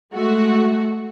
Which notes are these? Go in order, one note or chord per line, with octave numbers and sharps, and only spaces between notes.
G#3 A3 F#4